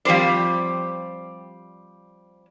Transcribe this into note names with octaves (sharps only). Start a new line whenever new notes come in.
F3 G3 C4 C5 D5